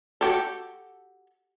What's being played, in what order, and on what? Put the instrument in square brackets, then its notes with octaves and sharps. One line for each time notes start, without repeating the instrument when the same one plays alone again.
[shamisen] F#4 G4 A4